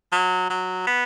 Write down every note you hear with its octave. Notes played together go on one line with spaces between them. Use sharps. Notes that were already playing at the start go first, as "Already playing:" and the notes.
F#3
F#3
B3